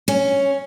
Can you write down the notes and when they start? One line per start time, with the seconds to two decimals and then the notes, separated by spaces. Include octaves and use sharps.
0.08 C#4